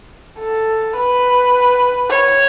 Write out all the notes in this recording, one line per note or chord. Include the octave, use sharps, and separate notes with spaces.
A4
B4
C#5